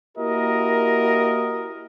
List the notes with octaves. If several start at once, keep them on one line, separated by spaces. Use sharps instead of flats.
A#3 E4 F#4 G4 A#4 D#5